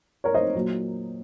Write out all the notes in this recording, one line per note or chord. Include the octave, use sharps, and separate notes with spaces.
A#4 C#5
C5 D#5
A#2 F#3